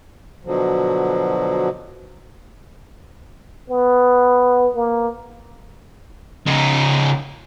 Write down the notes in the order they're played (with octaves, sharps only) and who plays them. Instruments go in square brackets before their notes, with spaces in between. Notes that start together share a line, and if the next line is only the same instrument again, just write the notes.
[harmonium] B2 D3 F3 F#3
[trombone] B3
A#3
[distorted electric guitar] C#3 D#4